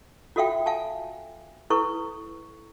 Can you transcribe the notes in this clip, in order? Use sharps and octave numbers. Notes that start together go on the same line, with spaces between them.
F4 F#4 A4 E5 F5 G5
F5 G#5 A5
E4 A4 B4 C#6